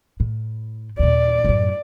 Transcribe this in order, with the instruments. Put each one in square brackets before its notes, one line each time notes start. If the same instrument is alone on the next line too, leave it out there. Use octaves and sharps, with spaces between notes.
[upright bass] A2
[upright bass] D#2 A#2 [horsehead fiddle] D5
[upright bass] F#2 A2